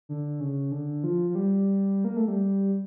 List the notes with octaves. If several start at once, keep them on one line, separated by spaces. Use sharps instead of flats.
D3
C#3
D3
F3
F3
G3
A#3
A3
G3